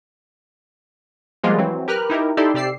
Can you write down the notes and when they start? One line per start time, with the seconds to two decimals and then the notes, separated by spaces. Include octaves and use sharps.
1.43 F3 G3 G#3 A#3 B3 F4
1.58 E3 F#3 C4
1.88 G4 A#4 B4 F6 F#6
2.10 D#4 E4 G4 A#4
2.37 D#4 E4 G4 A4 D5 C6
2.54 C3 G4 D5 E6 C7